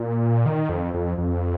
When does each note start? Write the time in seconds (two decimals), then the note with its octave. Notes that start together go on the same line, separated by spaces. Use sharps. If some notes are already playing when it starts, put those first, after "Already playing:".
Already playing: A#2
0.46 D#3
0.69 F2
0.94 F2
1.18 F2